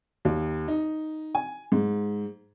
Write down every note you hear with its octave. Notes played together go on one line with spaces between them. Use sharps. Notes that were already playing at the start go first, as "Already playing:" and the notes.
D#2
D#4
G#5
G#2